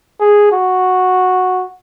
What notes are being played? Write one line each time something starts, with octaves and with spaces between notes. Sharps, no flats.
G#4
F#4